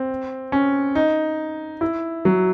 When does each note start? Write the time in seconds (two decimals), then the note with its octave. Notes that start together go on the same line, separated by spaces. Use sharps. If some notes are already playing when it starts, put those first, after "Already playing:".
Already playing: C4
0.52 C#4
0.95 D#4
1.81 E4
2.25 F#3